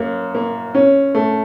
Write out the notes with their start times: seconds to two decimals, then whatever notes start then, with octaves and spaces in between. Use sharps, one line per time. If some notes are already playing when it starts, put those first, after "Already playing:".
Already playing: F#2 A#3
0.35 A#3
0.75 C#4
1.15 A3